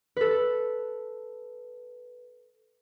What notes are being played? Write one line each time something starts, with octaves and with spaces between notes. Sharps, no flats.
A4 B4